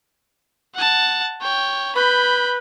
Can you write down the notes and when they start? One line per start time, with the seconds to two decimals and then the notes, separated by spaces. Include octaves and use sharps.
0.75 F#5 A5
1.42 C#5 G5
1.95 B4 B5 G6